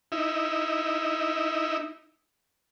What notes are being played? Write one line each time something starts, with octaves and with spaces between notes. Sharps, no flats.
D#4 E4